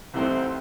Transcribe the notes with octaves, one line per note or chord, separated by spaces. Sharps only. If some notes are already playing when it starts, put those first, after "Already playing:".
C2 C3 E3 A3 C4 D#4